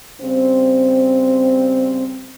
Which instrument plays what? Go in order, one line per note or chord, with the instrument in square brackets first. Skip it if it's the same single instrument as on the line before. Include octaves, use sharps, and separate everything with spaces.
[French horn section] C#3 G3 C4